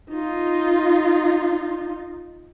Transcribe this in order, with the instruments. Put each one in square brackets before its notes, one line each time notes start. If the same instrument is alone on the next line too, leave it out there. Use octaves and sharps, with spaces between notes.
[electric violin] D#4 F4